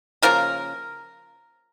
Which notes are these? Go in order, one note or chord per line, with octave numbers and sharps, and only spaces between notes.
C#3 F3 A#3 A#4